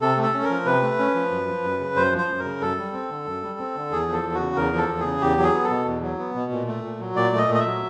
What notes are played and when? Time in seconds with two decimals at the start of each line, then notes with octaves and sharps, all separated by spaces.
0.01 C3 A4
0.17 A3
0.22 A4
0.33 C#4
0.44 A#4
0.50 F3
0.66 C3 B4
0.82 A3
0.99 C#4
1.15 F3
1.31 F#2
1.47 F3
1.64 F#2
1.79 C#3
1.96 F#2 C5
2.12 F3
2.18 C5
2.28 F#2
2.39 A#4
2.45 C#3
2.61 F#2 A4
2.77 G3
2.93 C4
3.09 D3
3.26 F#2
3.42 G3
3.59 C4
3.75 D3
3.92 E2 G#4
4.08 F3 A4
4.23 E2
4.35 F#4
4.40 C#3
4.56 E2 A#4
4.73 F3 A4
4.89 E2
5.00 G#4
5.05 C#3
5.21 E2 G4
5.37 F#3
5.43 G#4
5.54 B3
5.64 A4
5.70 B2
5.86 E2
6.03 F#3
6.19 B3
6.35 B2
6.52 A#2
6.67 A3
6.84 A#2
7.00 F#3
7.16 A#2 D5
7.32 A3
7.38 D#5
7.49 A#2
7.54 D#5
7.60 E5
7.65 F#3